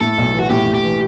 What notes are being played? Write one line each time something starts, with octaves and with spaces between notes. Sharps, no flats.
A2 A4
B1
E3 F#4
A2 G4
A2
G4
E3